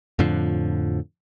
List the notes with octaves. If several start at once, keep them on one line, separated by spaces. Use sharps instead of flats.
F2 A2 D3 F3